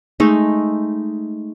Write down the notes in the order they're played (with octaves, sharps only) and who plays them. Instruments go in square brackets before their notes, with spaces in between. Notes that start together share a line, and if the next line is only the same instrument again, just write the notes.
[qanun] G#3 A3 D#4